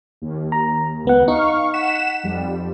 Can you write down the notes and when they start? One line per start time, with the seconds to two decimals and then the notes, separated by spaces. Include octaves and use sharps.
0.22 D#2
0.52 A#5
1.05 C#2 B3 F#5
1.28 D#4 F5 C#6
1.74 F#5 B6 E7
2.24 F2 G3